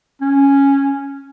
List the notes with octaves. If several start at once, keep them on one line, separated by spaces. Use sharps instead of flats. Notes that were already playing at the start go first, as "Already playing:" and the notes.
C#4